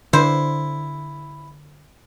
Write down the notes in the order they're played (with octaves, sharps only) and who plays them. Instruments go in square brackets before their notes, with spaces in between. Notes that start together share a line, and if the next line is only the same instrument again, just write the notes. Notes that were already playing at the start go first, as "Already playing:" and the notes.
[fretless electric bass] D3 [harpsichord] E4 [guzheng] C5